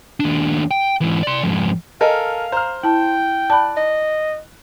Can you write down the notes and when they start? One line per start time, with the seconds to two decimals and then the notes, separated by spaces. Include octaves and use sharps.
0.20 D#2 D4
0.71 G5
1.01 G#2 E3
1.23 D5 C6
1.44 F2 G#2
2.01 A4 A#4 D#5 F5 G#5
2.52 C5 A#5 F6
2.84 E4 G5 A5
3.50 D5 A5 B5 F#6
3.77 D#5